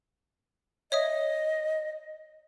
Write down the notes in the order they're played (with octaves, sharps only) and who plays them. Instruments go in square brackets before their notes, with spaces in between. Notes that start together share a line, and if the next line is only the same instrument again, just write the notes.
[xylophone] C#5 E5 D#6 [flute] D#5